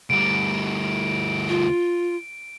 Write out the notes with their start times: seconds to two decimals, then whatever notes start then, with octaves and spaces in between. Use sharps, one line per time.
0.10 D2 G3 D7
1.49 F4